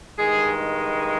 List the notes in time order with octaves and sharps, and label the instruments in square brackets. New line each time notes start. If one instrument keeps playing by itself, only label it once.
[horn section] G2 D#3 G#3 G#4